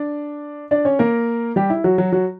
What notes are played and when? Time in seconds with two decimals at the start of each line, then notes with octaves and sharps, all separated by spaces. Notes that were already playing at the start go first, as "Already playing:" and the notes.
Already playing: D4 D5
0.71 D4 D5
0.85 C#4 C#5
0.99 A#3 A#4
1.56 G3 G4
1.70 E4
1.84 F#3 F#4
1.98 F#3 F#4
2.12 F#3 F#4